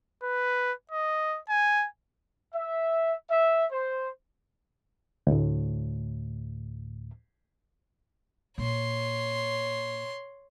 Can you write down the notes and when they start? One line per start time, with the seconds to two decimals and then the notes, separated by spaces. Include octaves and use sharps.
0.23 B4
0.91 D#5
1.49 G#5
2.53 E5
3.30 E5
3.71 C5
5.27 D2 A2
8.58 A#2 C#5 C6